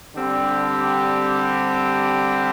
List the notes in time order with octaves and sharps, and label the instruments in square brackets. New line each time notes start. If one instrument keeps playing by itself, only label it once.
[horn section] D3 G3 C4 G4